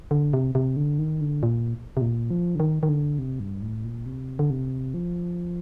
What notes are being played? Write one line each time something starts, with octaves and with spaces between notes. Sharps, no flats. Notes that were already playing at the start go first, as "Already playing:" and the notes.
D3
C3
C3
D3
D#3
D3
A#2
C3
A#2
F3
D3
D#3
D#3
D3
C3
G2
A2
A#2
C3
D3
C3
F3